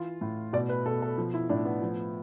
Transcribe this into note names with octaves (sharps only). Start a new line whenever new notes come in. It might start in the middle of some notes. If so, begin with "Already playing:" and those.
Already playing: E3 F4
A2
B2 D5
B4
B2 A4
A4
F3
E4
A2 D4
B3
F3